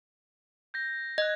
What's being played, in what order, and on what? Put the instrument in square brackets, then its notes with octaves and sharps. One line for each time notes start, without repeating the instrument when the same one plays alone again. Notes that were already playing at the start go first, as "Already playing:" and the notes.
[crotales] G6 A#6
[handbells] D#5 [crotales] F#6 G#6